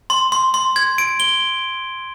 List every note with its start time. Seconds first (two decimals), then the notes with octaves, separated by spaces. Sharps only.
0.10 C6
0.32 C6
0.54 C6
0.76 G#6
0.98 D7
1.20 G7